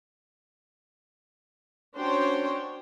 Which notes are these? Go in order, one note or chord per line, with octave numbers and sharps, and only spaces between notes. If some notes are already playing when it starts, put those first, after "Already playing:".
C#4 D4 F#4 C5 C#5 G5